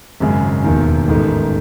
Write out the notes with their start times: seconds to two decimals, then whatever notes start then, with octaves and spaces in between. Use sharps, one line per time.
0.20 G#1 F#2 C#3 G#3
0.64 E1 D#2 D#3
1.08 A1 G#2 D#3 A3